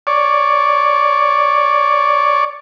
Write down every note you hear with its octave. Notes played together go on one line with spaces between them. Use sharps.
C#5 D5